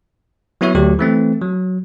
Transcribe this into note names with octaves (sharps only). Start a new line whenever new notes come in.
F#3 B3 E4 F#4 C#5 E5
D2 F#3 G4
E3 A3 C4
F#3